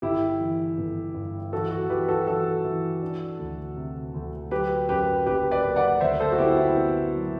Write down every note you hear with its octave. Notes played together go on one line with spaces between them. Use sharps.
G1 E4 G4
E3
G1
G2
E3 F#4 A4
F#4
E3 G4 B4
F#4 A4
E3 F#4 A4
E3
D4
D2
C3
D2
F#3 G4 B4
F#2 G4 B4
F#1 G4 B4
B4 D5
F#1
D5 F#5
D2 C5 E5
A4 C5
F#4
B3 E4 G4
E4
B3
F#3